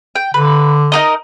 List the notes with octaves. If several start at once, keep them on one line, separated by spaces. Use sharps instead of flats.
G5
D3 B4
D#4 A#4 D#5